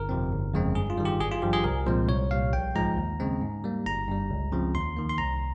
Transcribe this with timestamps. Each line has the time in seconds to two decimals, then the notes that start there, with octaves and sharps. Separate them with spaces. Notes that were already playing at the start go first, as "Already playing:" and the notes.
Already playing: G1 A#4
0.09 F2 C3 F3 C4
0.31 G1
0.53 F2 C#3 G#3 C4
0.75 G2 G#4
0.90 F4
0.98 D#3 G3
1.05 G4
1.20 G#1 G#4
1.31 F4
1.42 G2 F3 G4
1.53 G#4
1.64 C2 A#4
1.86 A#2 F3 G#3 C4 C5
2.08 C2 C#5
2.31 A#2 G3 F5
2.53 A#1 G5
2.75 G#2 F3 G#3 A#5
2.97 D#2
3.20 C#3 G#3 C4
3.41 G#2
3.64 G3 A#3
3.86 G1 A#5
4.08 G2 G3
4.31 C#2
4.52 C#3 F3 C4
4.75 D#2 C6
4.97 D#3 A#3
5.09 C6
5.18 C2 A#5